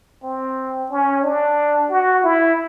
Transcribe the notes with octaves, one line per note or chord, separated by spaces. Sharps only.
C4
C#4
D4
F#4
E4